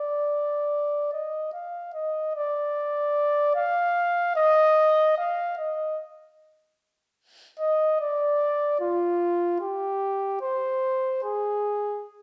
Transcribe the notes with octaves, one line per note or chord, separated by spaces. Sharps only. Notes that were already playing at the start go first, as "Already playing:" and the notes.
Already playing: D5
D#5
F5
D#5
D5
F5
D#5
F5
D#5
D#5
D5
F4
G4
C5
G#4